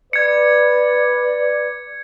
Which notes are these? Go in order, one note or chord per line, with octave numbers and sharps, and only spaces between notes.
B4 D5 G#6 C#7